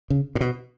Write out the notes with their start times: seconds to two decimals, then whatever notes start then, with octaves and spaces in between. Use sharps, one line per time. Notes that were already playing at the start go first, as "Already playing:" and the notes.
0.10 C#3
0.35 A2
0.41 B2